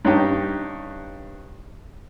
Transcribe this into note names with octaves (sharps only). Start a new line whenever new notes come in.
G2 C#4 D#4 G4